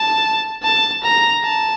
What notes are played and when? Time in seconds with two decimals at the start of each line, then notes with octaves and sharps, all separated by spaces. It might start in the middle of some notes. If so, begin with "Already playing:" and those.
Already playing: A5
0.63 A5
1.03 A#5
1.44 A5